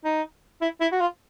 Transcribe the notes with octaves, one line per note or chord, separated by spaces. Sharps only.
D#4
E4
E4
F#4
F4